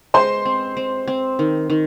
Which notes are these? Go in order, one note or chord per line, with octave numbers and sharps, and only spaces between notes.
G#3 C5 C6
C4
C4
C4
D#3
D#3